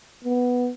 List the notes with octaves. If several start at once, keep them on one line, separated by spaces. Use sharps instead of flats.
B3